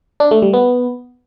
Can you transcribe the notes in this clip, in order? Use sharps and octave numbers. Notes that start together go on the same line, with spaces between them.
D4
A3
G3
B3